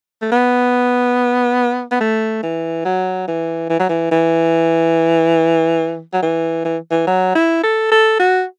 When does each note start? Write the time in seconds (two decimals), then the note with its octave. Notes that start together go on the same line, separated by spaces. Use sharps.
0.22 A3
0.32 B3
1.91 B3
2.01 A3
2.43 E3
2.85 F#3
3.28 E3
3.70 E3
3.80 F#3
3.89 E3
4.12 E3
6.13 F#3
6.23 E3
6.65 E3
6.91 E3
7.07 F#3
7.35 E4
7.63 A4
7.92 A4
8.20 F#4